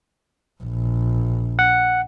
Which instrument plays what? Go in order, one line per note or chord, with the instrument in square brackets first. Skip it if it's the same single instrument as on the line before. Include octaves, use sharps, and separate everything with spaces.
[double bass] A#1
[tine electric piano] F#5